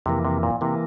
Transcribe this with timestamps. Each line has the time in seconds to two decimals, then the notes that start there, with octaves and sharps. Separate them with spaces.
0.06 F2 C3 E3 A#3
0.25 C3
0.43 A#2
0.61 C3 E3 A#3